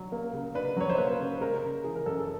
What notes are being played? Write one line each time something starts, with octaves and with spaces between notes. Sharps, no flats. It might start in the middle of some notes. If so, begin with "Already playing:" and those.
Already playing: F#3 D4
A#3
C#3
D4 B4
F#3 C#5
C5
A#3 B4
C#3
G#3 A#4
C#3
E3 G#4
A#4
F#2 A4
G#4